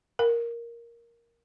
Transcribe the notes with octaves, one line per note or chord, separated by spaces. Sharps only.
A#4